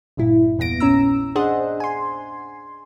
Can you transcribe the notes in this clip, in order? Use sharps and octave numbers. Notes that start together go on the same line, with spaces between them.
G1 G2 A#2 E4
E2 A#2 B3 A#6 D7
A#1 C#4 A#5 E6
D4 G#4 C5 D#5 F#5
G#5 C6